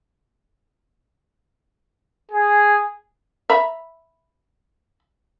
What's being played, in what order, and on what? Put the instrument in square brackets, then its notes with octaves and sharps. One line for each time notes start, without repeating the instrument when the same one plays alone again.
[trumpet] G#4
[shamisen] E5 A#5 B5